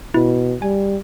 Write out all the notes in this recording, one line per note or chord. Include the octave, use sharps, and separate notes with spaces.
B2 E4
G3 G#5